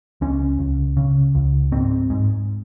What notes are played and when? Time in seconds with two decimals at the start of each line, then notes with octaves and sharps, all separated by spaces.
0.21 C#2 C#4
0.59 C#2
0.97 C#3
1.35 C#2
1.72 G#2 C4
2.10 G#2